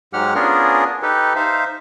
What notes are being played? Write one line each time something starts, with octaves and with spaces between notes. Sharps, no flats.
G#2 F#3 G#3 G4 F#5 F6
B3 C#4 D4 F4 G#4 A#4
D#4 G4 A4 B4
D#4 C5 E5 F5